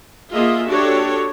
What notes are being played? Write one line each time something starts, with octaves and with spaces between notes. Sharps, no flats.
A#3 F4 G#4 D#5 E5
D4 F#4 G4 A4 C#5